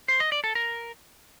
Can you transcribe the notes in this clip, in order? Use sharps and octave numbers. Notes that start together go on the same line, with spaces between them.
C5
D#5
D5
A4
A#4